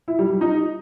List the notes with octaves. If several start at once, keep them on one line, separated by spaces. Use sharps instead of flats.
E4
G3
G3
D#4